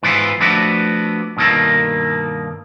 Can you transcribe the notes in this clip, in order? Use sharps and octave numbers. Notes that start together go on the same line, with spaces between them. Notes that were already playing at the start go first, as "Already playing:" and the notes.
G#2 E3 B3 E4 F4
F3 A3 B3 D4 E4 F#4
G2 B2 D#3 A#3 A4